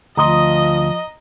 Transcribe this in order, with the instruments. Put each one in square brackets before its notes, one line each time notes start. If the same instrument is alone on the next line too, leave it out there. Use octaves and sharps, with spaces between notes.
[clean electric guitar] D2 C6 [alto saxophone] F3 [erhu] D#5 [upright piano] A#5 D#6